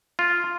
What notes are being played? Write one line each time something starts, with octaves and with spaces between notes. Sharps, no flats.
F4